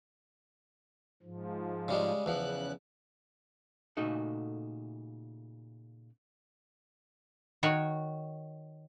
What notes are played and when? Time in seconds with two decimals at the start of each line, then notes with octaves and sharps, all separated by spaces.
1.23 G#2 F3
1.88 C#3 G3 G#3
2.26 E2 C#3 F3 F#6
3.97 A#2 C#3 A3 D#4 F#4 A4
7.63 D#3 F#4 C#5